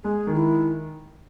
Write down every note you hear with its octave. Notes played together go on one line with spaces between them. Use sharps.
G#3 G#4
D#3
E4